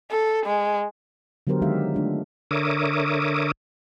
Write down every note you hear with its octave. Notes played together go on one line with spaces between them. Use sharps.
A4
G#3
D3 F#3 B3 G4 A#4 C5
D#3 G#3 D#4 G4 E5 F5
A3 D4 F4
D3 A#4 C#5 E5 D6 D#6